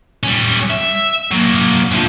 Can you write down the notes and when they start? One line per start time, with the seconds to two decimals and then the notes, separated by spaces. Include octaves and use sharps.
0.23 G3 C#4
0.71 E5
1.32 F#3 A#3
1.91 D2 F3